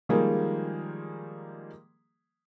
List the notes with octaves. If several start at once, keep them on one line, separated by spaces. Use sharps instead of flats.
D#3 F3 G3 G#3 A#3 G#4